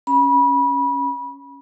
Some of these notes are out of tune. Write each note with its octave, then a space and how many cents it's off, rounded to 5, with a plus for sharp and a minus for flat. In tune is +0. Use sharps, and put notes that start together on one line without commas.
C#4 +0 B5 -25